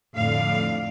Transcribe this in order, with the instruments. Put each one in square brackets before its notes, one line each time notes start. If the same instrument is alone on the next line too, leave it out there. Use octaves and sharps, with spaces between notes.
[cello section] F2 A2 D3 D4 F5